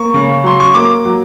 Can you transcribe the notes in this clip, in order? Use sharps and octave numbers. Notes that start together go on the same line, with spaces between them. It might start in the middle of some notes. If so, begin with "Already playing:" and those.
Already playing: A#3 C#6
C#3
F#3 C6
C#6
A#3 D6
F#3